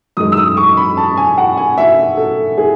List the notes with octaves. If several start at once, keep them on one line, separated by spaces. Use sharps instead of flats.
F#2 D#3 G#3 D#6
E6
D#6
C#6
B5
A5
G#5
F#5
G#5
E5
A4
G#4